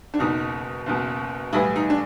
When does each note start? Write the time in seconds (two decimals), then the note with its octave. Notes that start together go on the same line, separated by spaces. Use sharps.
0.14 D4
0.19 F#1 E2 B2 D#4
0.86 F#1 E2 B2
1.53 B1 A2 E3 G3 B3 E4
1.76 D#4
1.90 D4